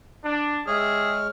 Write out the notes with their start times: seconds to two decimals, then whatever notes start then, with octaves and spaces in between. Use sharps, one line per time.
0.23 D4
0.67 G#3 G4 G#4 C#5 D#5 E5 F6